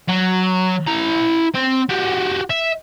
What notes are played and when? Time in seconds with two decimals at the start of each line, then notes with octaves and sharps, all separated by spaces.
0.09 F#3
0.87 E4 A#5
1.55 C4
1.90 F#4 G4
2.50 E5